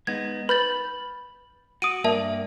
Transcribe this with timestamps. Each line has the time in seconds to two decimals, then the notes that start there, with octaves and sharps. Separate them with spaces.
0.07 G#3 B3 D#4 G#6
0.49 B4 B5 G6 A6
1.82 F#4 D#6 D7 D#7
2.04 G2 A#3 A#4 D5 E5 A5